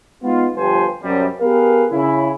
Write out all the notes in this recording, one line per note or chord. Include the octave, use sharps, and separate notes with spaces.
G#3 B3 D#4 F4
G1 F3 G4 B4 C5 G#5
F#2 C3 G3
B3 G4 G#4 A#4 B4 F5
C#3 E4